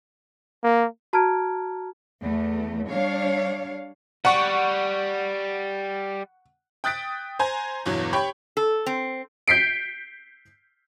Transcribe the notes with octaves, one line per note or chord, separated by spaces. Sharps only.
A#3
F#4 A5 A#5 F6 G#6 D7
E2 A3
G3 D4 C#5 F5
G3 F#5 C#6
G5 D#6 F#6 A6 B6 D7
C5 G#5 A#5
G1 E2 B2 E3 F#3
G4 C#5 G5 B5 C#6
A4
C4
G6 B6 C7 D7